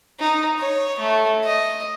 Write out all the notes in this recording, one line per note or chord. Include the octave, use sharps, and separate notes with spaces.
D#4
C#5
A3
D#5